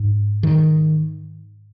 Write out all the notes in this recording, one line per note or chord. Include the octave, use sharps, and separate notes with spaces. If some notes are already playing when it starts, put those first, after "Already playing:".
Already playing: G#2
D#3